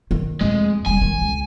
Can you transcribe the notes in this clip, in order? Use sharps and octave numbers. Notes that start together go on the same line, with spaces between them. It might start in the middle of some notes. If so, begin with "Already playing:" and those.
D#3
F2 G#3 A3
F1 G3 G#5
D1 D#3
C#2